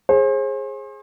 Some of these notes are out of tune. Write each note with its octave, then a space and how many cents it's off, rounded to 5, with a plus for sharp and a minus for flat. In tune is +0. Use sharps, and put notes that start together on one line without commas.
G#4 +0 C5 +40